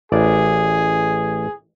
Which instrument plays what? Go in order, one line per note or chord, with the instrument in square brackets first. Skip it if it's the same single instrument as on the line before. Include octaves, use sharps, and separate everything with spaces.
[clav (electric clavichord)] A1 D5 [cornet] G#4